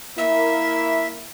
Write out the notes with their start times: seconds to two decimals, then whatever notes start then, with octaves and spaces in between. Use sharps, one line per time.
0.18 A#3 E4 E5